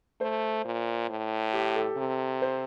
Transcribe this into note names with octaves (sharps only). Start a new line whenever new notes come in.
A3 C5
A#2
A2
G4
A4
C3
C5